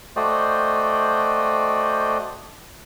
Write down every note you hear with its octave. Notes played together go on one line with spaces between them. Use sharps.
A3 F#4 C5 D5 D#5 G5